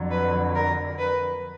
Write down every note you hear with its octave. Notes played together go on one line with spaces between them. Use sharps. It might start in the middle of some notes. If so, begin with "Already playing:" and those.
Already playing: F2 D3 F#3
B4
A#4
B4